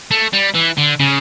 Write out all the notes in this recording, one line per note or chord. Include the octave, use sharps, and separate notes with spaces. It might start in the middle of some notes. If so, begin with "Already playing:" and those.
A3
G3
E3
D3
C#3